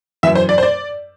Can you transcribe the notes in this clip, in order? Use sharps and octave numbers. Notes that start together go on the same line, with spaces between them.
F#2 E3 E5
C5
D5
C5
D5